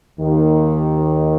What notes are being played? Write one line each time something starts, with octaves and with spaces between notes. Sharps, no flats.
D#2 D#3